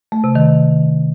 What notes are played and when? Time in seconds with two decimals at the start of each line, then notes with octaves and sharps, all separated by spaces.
0.12 A3
0.24 C3
0.35 D#3